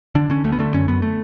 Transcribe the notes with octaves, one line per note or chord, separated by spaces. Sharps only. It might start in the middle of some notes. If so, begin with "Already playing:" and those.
D3 D4
D3 C#4
D2 A3
B3
D3 A3
F#2 C#4
F#2 B3
A3